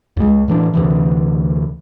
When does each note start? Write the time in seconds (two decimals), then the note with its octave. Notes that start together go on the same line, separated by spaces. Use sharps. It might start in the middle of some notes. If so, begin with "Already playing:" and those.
0.17 C#2 G#3
0.48 A2 E3 D4
0.73 D2 C3 E3